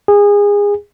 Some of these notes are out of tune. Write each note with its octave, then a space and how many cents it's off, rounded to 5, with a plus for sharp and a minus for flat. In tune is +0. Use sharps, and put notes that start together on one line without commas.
G#4 -25